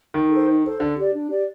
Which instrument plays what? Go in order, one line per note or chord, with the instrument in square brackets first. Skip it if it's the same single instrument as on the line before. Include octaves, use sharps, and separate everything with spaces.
[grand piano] D#3 [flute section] D#4
[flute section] A4 C5
D#4
A4 C5
[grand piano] D3 [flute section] D4
[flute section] G4 D5
D4
G4 D5